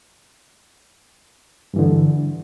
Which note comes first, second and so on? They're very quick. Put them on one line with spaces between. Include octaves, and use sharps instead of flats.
G2 E3 D3